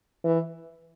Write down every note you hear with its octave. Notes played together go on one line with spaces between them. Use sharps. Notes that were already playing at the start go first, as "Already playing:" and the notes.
E3